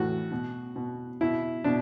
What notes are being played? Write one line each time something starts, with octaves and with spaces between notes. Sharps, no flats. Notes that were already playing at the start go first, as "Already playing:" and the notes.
Already playing: A2 E3 F#4
B2
B2
B2 E4
B2 D4